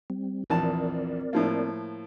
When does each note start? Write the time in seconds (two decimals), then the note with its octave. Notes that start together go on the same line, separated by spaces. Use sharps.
0.10 G3 C4
0.50 A#1 E2 C4 A#4 D5 A5
1.33 A2 F3 A#3